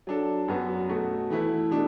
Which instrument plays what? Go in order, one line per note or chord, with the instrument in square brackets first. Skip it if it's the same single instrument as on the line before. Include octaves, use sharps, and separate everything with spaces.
[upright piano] F#3 D4 A4
F#2 F#3 B3 F#4
B2 A3 F#4
E3 A3 E4 B4
B2 A3 D4